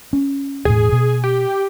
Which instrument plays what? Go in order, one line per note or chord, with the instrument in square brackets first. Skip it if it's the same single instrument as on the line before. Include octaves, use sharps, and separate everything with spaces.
[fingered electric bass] C#4
[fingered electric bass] E1 A2 [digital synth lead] G#4
[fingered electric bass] B2
[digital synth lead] G4